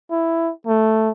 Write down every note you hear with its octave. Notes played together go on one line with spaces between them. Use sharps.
E4
A3